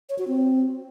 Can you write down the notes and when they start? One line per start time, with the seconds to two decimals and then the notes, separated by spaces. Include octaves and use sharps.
0.09 C#5
0.19 F#4
0.28 C4